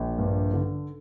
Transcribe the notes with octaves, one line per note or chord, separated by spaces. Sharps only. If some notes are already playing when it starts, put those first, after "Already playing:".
Already playing: A#1
G2
D3